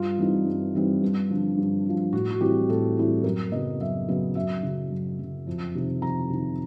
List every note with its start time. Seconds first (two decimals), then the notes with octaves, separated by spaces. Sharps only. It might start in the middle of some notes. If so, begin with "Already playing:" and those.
Already playing: G2 F4
0.18 E3 G3 C4 D#4
0.46 G2
0.75 E3 G3 C4 D#4
1.03 G2
1.30 D3 F3
1.57 G2
1.85 D3 F3
2.13 A2 F#4
2.31 F#4
2.41 E3 G3 C4 E4 G4
2.69 A2 A4
2.97 E3 G3 C4 E4
3.24 F#2 A#4
3.52 C#3 F#3 B3 D#5
3.81 F#2 E5
4.08 C#3 F#3 B3
4.35 F#2 E5
4.63 C#3 F#3
4.91 F#2
5.19 C#3 F#3
5.47 F2
5.75 C3 D#3
6.02 F2 A#5
6.30 C3 D#3